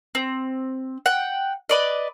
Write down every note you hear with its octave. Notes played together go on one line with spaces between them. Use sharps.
C4
F#5 G5
B4 D5 D#5